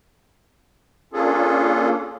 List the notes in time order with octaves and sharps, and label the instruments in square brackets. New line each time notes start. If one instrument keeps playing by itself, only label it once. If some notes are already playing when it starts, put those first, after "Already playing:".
[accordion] A#3 C#4 D4 F4 G#4 A4